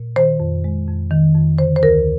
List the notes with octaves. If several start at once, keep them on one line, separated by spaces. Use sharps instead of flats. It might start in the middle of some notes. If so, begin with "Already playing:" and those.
Already playing: A#2
D#3 C5
F2
G#3
F2
D#3
F2
D3 C5
C5
D2 A#4